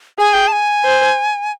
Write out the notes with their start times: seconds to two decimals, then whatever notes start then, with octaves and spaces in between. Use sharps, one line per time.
0.19 G#4 G#5
0.33 G5
0.48 A5
0.52 G#5
0.84 C5